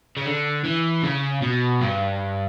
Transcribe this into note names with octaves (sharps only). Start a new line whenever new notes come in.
C#3
D3
E3
C#3
B2
G2